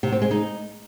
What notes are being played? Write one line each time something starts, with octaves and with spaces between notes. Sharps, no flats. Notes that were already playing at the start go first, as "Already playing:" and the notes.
C3
C4
G#3
D#4